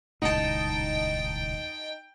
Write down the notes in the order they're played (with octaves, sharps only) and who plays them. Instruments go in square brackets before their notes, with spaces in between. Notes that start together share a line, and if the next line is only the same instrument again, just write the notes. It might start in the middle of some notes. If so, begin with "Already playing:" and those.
[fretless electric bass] D#1 C#2 A2 [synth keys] D#4 A5 [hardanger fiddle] G5